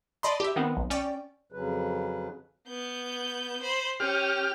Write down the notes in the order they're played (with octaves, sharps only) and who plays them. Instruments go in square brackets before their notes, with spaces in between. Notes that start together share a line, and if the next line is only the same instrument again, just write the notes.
[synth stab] D5 D#5 A5 B5 C6
G4 E5
D#3 B3 C4
B1
C#4 D5 G5
[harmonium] F2 C#3 F#3 B4
[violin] B3 G6
C5 B5
[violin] C#4 [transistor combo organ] G4 F6